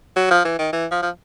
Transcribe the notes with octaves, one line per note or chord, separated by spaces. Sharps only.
F#3
F3
E3
D#3
E3
F3
F3